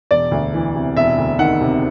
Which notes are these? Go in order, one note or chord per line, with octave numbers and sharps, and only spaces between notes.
E1 D5
D2
E3
C3
E1 E5
D2
D#3 F#5
C3